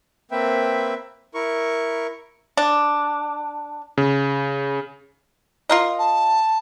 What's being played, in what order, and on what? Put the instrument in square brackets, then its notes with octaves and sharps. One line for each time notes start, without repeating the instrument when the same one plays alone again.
[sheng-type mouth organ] A#3 C4 B4 E5 G5
E4 A#4 C#6
[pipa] D4
[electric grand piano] C#3
[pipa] F4 A#4 D#5
[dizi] A5